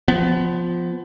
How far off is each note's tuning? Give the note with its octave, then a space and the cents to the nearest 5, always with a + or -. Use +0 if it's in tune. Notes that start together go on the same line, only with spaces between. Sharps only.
F3 +0 B3 +20